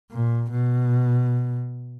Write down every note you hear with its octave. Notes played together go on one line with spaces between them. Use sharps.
A#2
B2